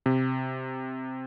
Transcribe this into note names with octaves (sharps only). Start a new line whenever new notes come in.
C3